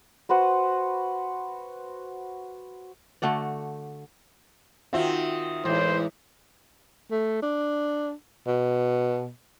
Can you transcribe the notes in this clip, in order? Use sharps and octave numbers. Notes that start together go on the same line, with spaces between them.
F#4 B4 C5 F#5
D3 A3 F#4 D5
D#3 C4 F4 F#4 E5
A2 E3 G#3 C5
A3
D4
B2